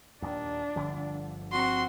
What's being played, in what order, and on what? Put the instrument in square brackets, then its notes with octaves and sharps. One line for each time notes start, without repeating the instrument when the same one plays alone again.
[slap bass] D#2 A#2 [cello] D4
[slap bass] G1 D3 F3
[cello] C4 [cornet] F#4 [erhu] C6